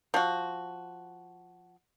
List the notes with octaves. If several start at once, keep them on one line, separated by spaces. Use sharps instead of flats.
F3 F#4